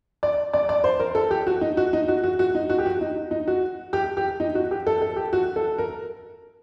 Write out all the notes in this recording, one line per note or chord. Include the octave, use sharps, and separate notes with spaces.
D5
D5
D5
C5
A#4
A4
G4
F#4
D#4
F#4
D#4
F#4
F#4
F#4
D#4
F#4
G4
F#4
D#4
D#4
F#4
G4
G4
D#4
F#4
G4
A4
A4
G4
F#4
A4
A#4